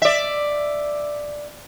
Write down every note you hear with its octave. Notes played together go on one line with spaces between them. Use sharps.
D5 E5